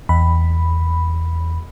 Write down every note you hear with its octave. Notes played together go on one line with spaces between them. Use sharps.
E2 B5